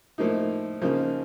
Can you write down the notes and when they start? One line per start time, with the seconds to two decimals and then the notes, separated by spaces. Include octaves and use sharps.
0.18 A2 F3 A#3 D#4
0.82 C#3 F3 A#3 D#4